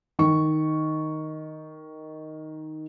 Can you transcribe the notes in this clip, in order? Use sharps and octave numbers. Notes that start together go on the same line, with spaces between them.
D#3 C#6